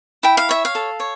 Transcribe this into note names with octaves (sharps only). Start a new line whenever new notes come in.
E4 G5
F5
C#5 E5
F5
A4
C#5